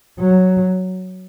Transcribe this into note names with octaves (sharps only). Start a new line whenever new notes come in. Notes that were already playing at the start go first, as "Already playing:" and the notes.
F#3